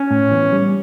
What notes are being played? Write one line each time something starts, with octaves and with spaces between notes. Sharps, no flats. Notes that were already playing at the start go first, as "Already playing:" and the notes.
Already playing: C#4
A2
E3 B3
G3